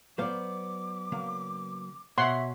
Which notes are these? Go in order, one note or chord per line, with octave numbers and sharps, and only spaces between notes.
F#3 B3 C5 D5 F5 D6
C#3 F#3 A#3
B2 C#5 E5 F#5 C6